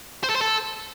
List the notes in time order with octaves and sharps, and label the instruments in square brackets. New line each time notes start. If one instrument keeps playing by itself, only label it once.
[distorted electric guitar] C5
A4
C5
A4